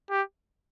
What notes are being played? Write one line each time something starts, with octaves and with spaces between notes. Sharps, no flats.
G4